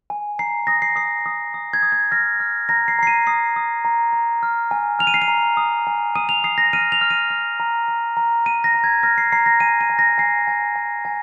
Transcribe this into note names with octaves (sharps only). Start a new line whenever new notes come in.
G#5
A#5 C7
D#6 A#6
C7
D#6 C7
D#6
D#6
G#6
D#6
G#6
F6 A#6
F6
A#5 A#6
C7
A#5 C7
D#7
D#6 C7
D#6
A#5
A#5
F6
G#5
F6 F7
D#7
C7
D#7
A#5
D#6
G#5
D#6 D#7
F7
D#6 C7
A#6
F6 D#7
F7
F6
D#7
F6
A#5
A#5
A#5
A#5 D#7
A#6
A#5
G#6
F6 A#6
C7
A#5 C7
A#6
G#5 D#7
D#7
G#5
A#6
G#5 C7
G#5
G#5
G#5